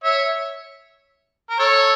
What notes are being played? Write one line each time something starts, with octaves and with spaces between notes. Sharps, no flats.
C#5 E5
A#4
A4 C#5